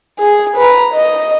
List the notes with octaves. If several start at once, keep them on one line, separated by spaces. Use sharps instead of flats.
G#4
B4 A#5
D#5